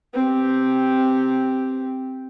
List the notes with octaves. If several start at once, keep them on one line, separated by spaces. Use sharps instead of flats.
C4 G4